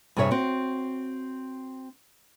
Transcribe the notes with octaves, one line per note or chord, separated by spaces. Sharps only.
G2 C3 G#4 C#5 E5
C4 F#4